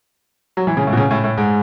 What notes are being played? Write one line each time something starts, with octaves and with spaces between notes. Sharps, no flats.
F#3
E3
C#3
A2
B2
C#3
A2
A2
G#2